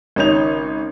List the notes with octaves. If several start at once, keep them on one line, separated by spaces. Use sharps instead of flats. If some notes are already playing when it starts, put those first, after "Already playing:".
G#1 C#3 C#4 D#4 G6 F7